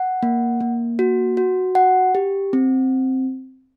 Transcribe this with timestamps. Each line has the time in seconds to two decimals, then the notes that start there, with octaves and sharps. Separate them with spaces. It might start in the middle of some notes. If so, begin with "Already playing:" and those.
Already playing: F#5
0.23 A#3
0.60 A#3
0.99 F#4
1.37 F#4
1.75 F#5
2.15 G4
2.53 C4